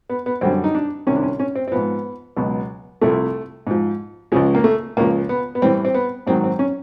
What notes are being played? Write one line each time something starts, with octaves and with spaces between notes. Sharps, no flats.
B3
B3
F#2 D3 G3 C4
D#4
D4
C2 C3 D#3 C#4
D4
C#4
C#4
C4
C4
G#2 F3 B3
C#2 B2 F#3
C2 C3 F3 A3
G#2 F3
C#2 C#3 F3 G#3
A#3
A3
C#2 C#3 F3 A#3
B3
B3
A2 E3 G3 C4
C4
B3
G#2 D#3 F#3 C4
C4
C#4